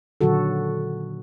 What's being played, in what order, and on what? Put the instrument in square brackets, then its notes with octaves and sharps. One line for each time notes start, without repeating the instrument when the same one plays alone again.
[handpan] A#2 D3 D#3 F#3 F#4 A4